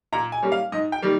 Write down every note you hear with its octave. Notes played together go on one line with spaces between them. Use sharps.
A#2 A#5
G#5
G3 A#3 C#4
F5
G#2 D#5
G5
D#3 G3 A#3